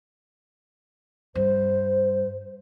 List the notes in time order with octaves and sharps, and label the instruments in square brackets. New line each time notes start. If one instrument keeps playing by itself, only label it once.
[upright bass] G2 [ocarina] C5